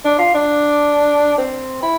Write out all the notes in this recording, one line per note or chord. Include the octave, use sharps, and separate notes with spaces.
D4
F4
D4
C4
E4